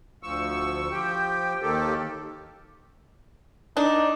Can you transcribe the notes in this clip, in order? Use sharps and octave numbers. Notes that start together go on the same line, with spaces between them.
D2 F3 C#6 E6
F3 G4 G5
D#2 D#3 G4 A4
D4 D#4